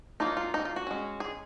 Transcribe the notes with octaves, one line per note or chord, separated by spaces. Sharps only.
F#3 A#3 D#4 F4
F4
D#4
F4
F#4
G#3 C#4
G#4